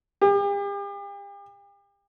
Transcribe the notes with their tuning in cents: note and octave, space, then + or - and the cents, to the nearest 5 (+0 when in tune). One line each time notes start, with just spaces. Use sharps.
G4 +40